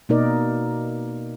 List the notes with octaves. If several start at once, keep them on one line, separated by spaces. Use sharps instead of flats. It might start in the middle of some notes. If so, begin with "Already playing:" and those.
B2 A#3 D#4 A#4 D5